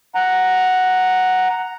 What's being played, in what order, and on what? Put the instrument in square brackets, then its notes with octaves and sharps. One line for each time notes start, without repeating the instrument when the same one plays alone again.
[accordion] F#5 A#5